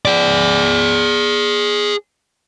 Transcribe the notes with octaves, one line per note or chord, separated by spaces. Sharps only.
G#4 D5